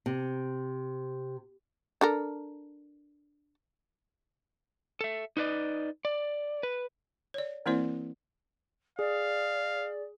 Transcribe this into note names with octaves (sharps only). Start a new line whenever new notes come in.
C3
D4 A4 A#4
A4 E5
D#4 B4 D5 D#5
D5
B4
C#5 D5
E3 A#3 C4 E4 C5 D5
G#4 D5 F5